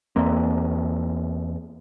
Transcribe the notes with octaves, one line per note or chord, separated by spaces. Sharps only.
E2 A#3 C4